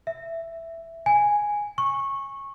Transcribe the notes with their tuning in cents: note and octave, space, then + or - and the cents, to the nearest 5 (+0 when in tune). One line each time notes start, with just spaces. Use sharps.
E5 +5
G#5 -5
C#6 -15